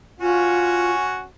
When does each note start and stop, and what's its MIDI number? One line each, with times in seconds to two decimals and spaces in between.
0.20 1.24 61
0.20 0.92 65
0.20 1.24 66